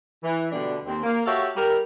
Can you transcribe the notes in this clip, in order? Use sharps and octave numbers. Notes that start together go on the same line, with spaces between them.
E3
B2 D3 G3 A3 B3 D4
D#2 C4
A#3
F#4 G4 A4 C#5 E5 F5
G3 A#4